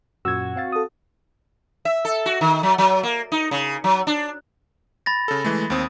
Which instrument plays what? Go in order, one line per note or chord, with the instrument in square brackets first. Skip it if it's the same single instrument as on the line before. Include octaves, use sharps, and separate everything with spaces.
[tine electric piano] F#2 A#2 [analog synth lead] F#4 [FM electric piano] E6 G#6
[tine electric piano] C4 F5 A6
[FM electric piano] A4 D#6
[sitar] E5
A4
F#4
D#3
F#3
F#3
A#3
D#4
C#3
F#3
D4
[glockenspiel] B5 A6 A#6
[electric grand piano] C#3 A4
E3 G#3 A3
D#2 C4 D#6